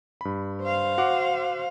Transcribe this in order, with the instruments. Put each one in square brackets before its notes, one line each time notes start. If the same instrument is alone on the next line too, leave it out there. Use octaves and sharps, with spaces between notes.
[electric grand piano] G2 B5
[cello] C5 F5
[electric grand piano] F#4 F#5 D6